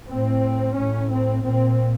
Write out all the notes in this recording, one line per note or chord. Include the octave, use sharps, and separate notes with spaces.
A2 C4
A2 C#4
C4
A#2 C4